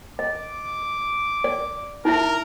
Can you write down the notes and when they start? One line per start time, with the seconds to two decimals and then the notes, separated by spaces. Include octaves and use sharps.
0.19 D#5 D6
1.44 D5
2.05 D#4 E4 A#4 E5